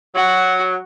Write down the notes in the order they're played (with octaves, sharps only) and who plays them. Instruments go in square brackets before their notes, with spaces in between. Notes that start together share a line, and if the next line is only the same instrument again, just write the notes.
[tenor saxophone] F#3 [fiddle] F#4